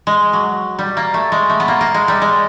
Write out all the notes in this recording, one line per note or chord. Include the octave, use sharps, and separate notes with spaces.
G#3
F#3
G3
A#3
A3
G#3
A3
B3
A#3
A#3
G#3
G3
G#3